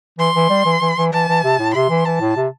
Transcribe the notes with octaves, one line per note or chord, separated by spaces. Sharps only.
E3 C6
E3
G3
E3
E3
E3
E3 A5
E3
C3
A2
C3 C6
E3
E3 A5
A2
C3